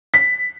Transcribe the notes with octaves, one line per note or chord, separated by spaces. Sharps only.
B6